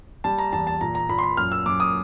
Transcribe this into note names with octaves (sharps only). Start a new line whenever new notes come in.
G3 A5
A#5
E2 A5
A5
A#2 A#5
A#5
A#2 B5
C6
B5
F#2 F6
E6
F#2 D6
D#6